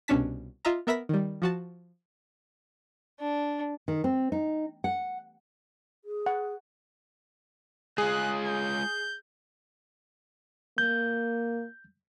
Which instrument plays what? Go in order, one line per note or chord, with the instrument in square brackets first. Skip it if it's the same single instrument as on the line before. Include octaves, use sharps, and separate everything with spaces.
[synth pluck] C2 B2 C#4 D4 A5 B6
F4 D#5 E5 A#5
B3 A#4 E5 B5 A#6 B6
D#3 G3
F3 F#4 A5
[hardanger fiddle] D4
[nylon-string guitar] D#3
C4
D#4
F#5
[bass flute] G#4
[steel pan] F#5
[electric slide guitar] G#3 F4 [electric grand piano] G#4 [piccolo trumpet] F#6
[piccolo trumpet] G6
[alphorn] A#3 [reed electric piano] G6